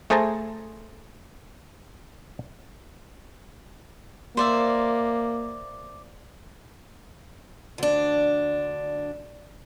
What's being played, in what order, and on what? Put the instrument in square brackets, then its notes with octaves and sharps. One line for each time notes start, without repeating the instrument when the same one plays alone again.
[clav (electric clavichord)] A3 G#4 C5 A5 A#5
[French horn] A#3 [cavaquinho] C5 D5 E5
[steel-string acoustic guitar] D2 D4